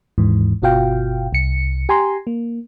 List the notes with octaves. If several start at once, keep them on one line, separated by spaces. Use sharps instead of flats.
D#2 G#2 E3
G1 B2 F4 F#4 F5 G5
C2 C#7
G4 G#5 A#5 C6
A#3